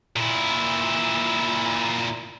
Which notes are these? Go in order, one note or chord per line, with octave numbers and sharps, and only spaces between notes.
A#2 E4